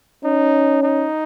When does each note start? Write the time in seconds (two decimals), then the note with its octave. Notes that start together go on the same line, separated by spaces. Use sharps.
0.24 C#4 D#4
0.83 D#4